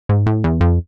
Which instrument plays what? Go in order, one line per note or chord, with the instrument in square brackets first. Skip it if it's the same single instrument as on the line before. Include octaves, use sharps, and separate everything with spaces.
[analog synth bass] G#2
A2
E2
F2